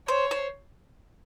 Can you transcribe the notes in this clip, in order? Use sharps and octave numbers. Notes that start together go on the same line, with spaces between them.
C5 C#5
C5